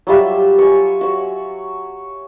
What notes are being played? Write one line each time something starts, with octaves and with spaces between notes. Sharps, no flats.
F#3 G3 F4 E5
C#5 G#5
F#4 C#5